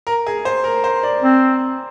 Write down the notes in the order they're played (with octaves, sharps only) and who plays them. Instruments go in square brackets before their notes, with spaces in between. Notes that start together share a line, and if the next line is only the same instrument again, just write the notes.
[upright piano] A#4
G#4
C5
A#4
C5
D5
[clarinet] C4